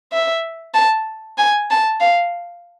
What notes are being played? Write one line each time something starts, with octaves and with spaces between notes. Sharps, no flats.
E5
A5
G#5
A5
F5